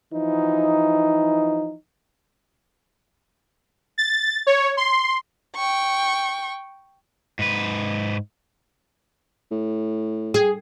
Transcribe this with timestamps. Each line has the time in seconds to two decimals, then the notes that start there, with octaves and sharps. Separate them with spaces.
0.13 E3 F3 D#4
3.98 A6
4.47 C#5
4.77 C6
5.56 G5 C#6
7.39 G#2 B4
9.51 A2
10.34 G#4